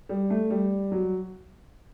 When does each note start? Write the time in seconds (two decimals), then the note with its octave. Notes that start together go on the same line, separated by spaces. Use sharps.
0.09 G3
0.30 A3
0.50 G3
0.92 F#3